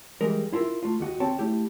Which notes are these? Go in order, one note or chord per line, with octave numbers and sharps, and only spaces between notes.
E3 G3 G#3 A#4
E4 F4 A#4 E5
A3 F4
D#2 F#4 D#5
C4 C#5 G5 A5
A3 E4 G4